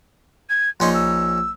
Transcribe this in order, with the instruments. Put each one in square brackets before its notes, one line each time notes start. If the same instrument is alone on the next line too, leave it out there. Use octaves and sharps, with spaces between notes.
[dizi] G#6
[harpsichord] A#1 C#4 D#4 [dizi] C6
[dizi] E6